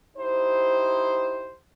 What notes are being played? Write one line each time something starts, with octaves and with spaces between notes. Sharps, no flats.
D#4 E4 G4 C5